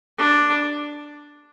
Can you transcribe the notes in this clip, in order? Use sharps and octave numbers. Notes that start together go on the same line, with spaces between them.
D4